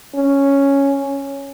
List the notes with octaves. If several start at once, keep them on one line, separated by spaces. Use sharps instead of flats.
C#4